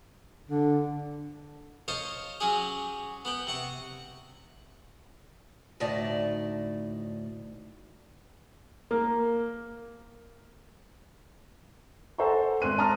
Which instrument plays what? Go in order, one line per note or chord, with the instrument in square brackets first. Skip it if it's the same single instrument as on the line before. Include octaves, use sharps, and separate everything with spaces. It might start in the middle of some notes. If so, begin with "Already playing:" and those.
[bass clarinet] D3 [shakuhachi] D4
[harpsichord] C5 C#5 D#5 F5 A5
F#3 C#4 G4 G#4
B3 B4 G5
C3 F#5 C#6
[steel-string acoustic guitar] D2 A2 D#4 D5 A5
[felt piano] A#3
A4 C5 F#5 G#5 A#5 C#6
G#1 C4 C6 F#6 D#7
A5 A#5 C6 D#6 F6